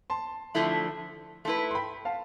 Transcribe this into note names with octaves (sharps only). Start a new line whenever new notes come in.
A5 C6
D3 F3 A3 E4
A3 E4 B4 A5 C6
C6
G5 B5
F5 A5